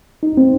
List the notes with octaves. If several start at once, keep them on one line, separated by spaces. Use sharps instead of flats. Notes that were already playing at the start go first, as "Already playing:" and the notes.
D#4
C4